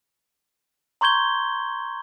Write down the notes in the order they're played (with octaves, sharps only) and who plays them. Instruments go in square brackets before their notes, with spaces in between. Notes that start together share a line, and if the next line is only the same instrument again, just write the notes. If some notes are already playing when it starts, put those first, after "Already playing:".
[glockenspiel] A#5 C6 C#6 G6 G#6 G7